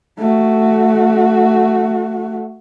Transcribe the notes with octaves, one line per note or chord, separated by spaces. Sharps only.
A3 F#4